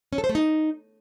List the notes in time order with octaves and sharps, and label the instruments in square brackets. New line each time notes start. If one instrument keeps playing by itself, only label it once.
[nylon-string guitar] C#4
A4
C5
A3
D#4